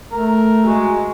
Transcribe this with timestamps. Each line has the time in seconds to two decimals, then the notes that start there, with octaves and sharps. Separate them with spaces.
0.12 A3 A#4
0.66 G#3 F#4